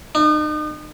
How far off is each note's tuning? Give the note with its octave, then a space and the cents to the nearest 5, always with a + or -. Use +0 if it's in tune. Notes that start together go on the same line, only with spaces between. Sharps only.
D#4 -40